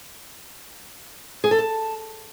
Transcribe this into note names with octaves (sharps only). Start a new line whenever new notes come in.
G#4
A4
A5